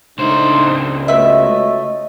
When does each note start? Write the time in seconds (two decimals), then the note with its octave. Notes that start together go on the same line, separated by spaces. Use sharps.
0.18 C#2 A2 C4 D4 D#4 C5
1.08 A3 B3 F#4 C#5 D#5 E5